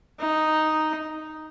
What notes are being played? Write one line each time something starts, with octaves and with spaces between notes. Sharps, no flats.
D#4